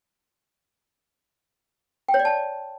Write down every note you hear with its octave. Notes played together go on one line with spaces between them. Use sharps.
G5
C#5
D5
A5